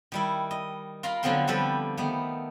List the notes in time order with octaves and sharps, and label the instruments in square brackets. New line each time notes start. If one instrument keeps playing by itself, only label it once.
[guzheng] D#3 G3 E4
D#5
F4 A#4 F5 A#5 B5
D3 F3 F#3 B3 C4 C6
D3 F3 G3 G4 A4 B4
D#3 A3 B3